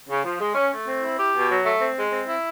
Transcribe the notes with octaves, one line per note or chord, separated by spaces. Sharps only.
C#3
F3
G#3
C#4
A3
C4
E4
G4
B2
F#3
A3
C4
G#3
C4
E4